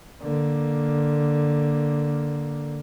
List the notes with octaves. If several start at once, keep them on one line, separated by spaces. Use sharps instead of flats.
D3 A#3